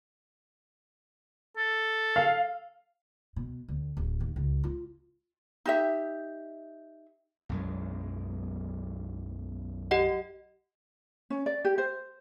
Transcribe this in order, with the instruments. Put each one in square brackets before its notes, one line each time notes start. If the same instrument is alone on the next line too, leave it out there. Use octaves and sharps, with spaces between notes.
[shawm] A4
[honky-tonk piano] F5
[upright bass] B2
D2
D1
D#2
C#2
F4
[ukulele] D#4 G4 E5
[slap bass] B1 F#2 G#3
[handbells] G4 D#5 F#5
[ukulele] C#4
D5
G4
C5